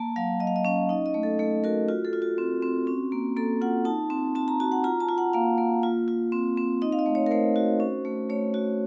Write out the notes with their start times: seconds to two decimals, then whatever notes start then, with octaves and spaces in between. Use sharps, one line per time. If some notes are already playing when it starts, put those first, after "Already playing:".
Already playing: A#3 A5
0.16 F#3 F5
0.40 F#3 D#5
0.47 F5
0.56 D#5
0.65 C#4 F5
0.89 D#4 D#5
1.06 D#5
1.14 A3
1.23 A4
1.39 A3 A4
1.64 F#4 A#4
1.88 F4 F#4
2.05 A4
2.13 F4
2.22 F#4
2.38 C4
2.62 C4
2.87 C#4
3.12 A#3
3.36 A#3 A4
3.62 F4 F#5
3.85 D#4 A5
4.10 C4
4.35 C4 A5
4.48 A#5
4.60 F#4 A5
4.72 F#5
4.84 F4 A#5
5.00 A5
5.09 F4
5.18 F#5
5.33 A#3 F5
5.58 A#3
5.83 F4
6.08 F4
6.32 C4
6.57 C4
6.82 D#4 D#5
6.92 F5
6.99 D#5
7.06 A3
7.15 C#5
7.26 A#4
7.31 A3 C5
7.56 F#4
7.80 C#4
8.05 A3
8.30 A3 C#5
8.54 F#4